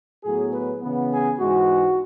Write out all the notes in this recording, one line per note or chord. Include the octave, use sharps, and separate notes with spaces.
A2 F#3 B3 G#4
B4
C#3 E3 B3
G#4
G#2 E3 G#3 F#4